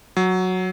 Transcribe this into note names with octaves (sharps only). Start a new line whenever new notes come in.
F#3